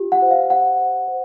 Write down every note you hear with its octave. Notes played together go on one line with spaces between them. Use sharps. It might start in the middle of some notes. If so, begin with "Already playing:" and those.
Already playing: F4 G4
F#5
C5
F5
G4 F#5
C5
C5